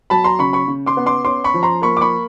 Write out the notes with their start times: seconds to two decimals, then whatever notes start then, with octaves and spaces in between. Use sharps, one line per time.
0.10 F#3 A5 B5
0.24 A#5 C6
0.39 C#3 B5 C#6
0.53 B5 C#6
0.68 C#3
0.86 C6 D6
0.97 B3
1.06 C6 D6
1.25 C#4 C6 D6
1.44 B5 C#6
1.54 F3
1.63 A#5 C6
1.82 A#3 B5 C#6
1.97 D6
2.01 B5 C#6